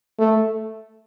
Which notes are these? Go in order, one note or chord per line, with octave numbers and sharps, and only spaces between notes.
A3